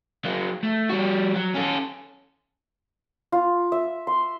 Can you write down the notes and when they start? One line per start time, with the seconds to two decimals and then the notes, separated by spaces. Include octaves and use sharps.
0.25 F#3 A#3
0.63 A3
0.90 G3 F#4
1.35 F#3
1.54 C#4 A4
3.32 F4
3.72 E5
4.07 C6